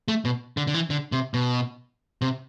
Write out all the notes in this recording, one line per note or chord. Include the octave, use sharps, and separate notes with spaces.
A3
B2
D3
D3
E3
D3
C3
B2
C3